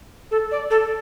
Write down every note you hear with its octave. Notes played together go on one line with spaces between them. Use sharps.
A4
D5
A4